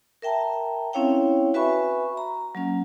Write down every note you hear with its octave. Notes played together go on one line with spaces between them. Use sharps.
A#4 E5 G5 A5 A#5
C4 C#4 E4 C#5 F5 G5
F#4 B4 E5 G#5 B5 C#6
A#5
F#3 A#3 C#4